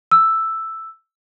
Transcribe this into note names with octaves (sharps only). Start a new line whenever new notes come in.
E6